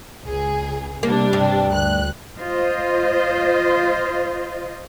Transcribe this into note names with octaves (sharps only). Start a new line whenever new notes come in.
C#2 G#4
C3 G3 A#3 D4
G2
D2 F#6
F4 C5 D#5